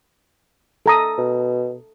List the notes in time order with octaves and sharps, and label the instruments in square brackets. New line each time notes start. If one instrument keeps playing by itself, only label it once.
[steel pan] A4 A#5 D#6
[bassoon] B2